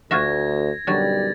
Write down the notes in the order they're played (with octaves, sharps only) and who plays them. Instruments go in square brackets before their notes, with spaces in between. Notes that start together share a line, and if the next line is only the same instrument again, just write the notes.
[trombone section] D2 [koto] F4 F#4 E5 [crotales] G#6 A#6
[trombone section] B1 F#2 G3 [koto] D3 F#3 [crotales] A6